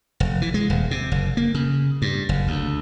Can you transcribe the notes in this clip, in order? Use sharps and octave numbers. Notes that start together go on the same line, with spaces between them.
F1
E3
G#3
D#1
C3
F#1
A#3
C#3
G2
F#1
D2